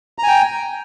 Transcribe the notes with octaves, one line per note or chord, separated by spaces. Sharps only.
G5 G#5 A#5